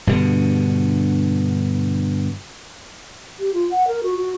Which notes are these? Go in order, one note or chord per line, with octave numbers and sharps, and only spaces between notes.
G2 B2 D3
G4
F4
F#5
A#4
F#4
F#4